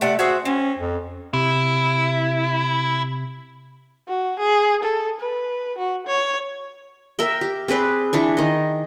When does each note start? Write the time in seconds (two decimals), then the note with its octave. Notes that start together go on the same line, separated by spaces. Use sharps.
0.01 C3 A3 D5 F#5
0.19 F#4 G#4 C5 E5
0.45 C4 C#4
0.79 F2
1.33 C3 E4
4.08 F#4
4.39 G#4
4.83 A4
5.20 B4
5.78 F#4
6.07 C#5
7.19 A#4 E5 G5
7.41 G4
7.68 C4 G#4 B4 D5
8.13 E3 D4 C#6
8.37 D#3 D#5